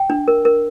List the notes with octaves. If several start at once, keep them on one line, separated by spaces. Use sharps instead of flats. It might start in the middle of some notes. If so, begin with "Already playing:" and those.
Already playing: G5
D4
A#4
A#4